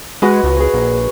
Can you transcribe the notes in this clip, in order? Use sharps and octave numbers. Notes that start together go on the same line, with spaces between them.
G#3 F#4 B4 D#5
C#2
G#4 C#5
A#1